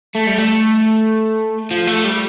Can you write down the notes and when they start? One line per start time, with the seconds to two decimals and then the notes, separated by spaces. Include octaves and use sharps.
0.15 A3
0.27 G3
0.38 A3
1.71 F3
1.87 A3
2.05 G3